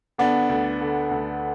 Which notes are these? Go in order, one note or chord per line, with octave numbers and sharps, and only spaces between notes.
D3 B3 D4
D2
D3
D2